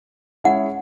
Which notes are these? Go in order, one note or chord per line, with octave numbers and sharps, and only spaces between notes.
G#3 C#4 E4 G#4 C#5 F#5